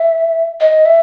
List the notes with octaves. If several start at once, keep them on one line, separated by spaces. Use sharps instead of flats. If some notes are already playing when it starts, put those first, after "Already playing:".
Already playing: E5
D#5
E5